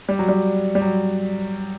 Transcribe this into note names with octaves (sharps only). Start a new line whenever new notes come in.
G3
F#3
G3
G3
F#3